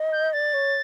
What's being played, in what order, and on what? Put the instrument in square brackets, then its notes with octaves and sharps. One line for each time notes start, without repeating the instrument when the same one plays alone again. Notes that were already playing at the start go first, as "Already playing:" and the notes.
Already playing: [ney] D#5
[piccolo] G6
[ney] D5 [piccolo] A6
[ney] C#5